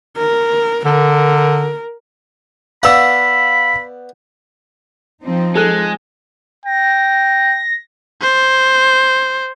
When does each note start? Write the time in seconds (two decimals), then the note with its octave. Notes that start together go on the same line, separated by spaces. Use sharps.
0.17 A#4
0.85 D3 A#4
2.83 B3 D5 F5 F#5 B5 E6
5.22 F3 C4 D#4
5.55 G#3 G#4 A4 F#6
6.65 G5 A#6
8.21 C5